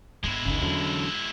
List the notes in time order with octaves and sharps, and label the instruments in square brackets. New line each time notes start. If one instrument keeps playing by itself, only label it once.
[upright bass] G1 B3 [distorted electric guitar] G#3 E4
[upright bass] F#1 C#2 [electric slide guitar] C#3 D#4
[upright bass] E2 [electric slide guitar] D3 F#3 C#4